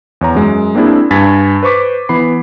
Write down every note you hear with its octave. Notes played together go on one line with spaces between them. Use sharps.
E2 C#5 A#5
F#2 G#3
A#3 C4 D4 E4 G#4
G2 G#5 G#6 A6 B6
B4 C5 C#6 D6 B6
E3 B3 B5 C7